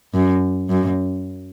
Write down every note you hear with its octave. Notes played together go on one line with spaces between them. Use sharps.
F#2
F#2